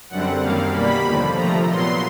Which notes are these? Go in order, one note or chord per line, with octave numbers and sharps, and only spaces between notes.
F#2 D3 G3 C4 F#5
F#2 D#3 G3 A#3 F5
B2 G3 A#3 B5
D#2 D3 F3
C3 F3 A3 A#5
A#2 F#3 B3 C6